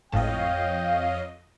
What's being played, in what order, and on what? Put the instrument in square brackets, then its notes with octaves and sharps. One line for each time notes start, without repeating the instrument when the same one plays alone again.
[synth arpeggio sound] G#1 A2 A5 [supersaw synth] F2 D#5 [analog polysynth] C#5 F5 [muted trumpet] G5